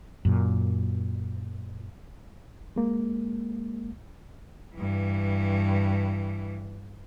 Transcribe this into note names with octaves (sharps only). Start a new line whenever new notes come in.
F#2 A#2
G#3 A#3
G2 E3